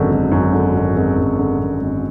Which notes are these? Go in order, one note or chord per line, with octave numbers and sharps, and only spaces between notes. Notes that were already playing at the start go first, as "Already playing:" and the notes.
Already playing: G#1 F#2 D3
G#1
F#2
D3
G#1
G#1
F#2
D3
G#1
G#1